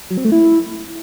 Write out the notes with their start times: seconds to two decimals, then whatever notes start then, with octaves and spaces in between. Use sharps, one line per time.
0.10 F#3
0.17 C4
0.25 A3
0.32 E4